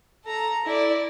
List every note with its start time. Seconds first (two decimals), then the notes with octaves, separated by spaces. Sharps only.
0.24 A4 A#5
0.65 E4 D5